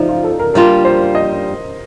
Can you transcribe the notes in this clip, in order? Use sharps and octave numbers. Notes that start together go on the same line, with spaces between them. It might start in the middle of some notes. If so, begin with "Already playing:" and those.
Already playing: F3 A3 D#4 D5
F4
A4
A#4
G3 A#3 D4 F4 A#4
C5
D#5